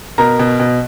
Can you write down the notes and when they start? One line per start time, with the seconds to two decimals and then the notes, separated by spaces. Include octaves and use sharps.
0.18 B2 A#4 A#5
0.39 B2
0.60 B2